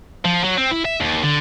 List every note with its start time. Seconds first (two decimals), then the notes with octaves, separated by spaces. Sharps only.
0.25 F3
0.44 F#3
0.57 C4
0.71 E4
0.85 E5
1.01 D#2
1.23 D3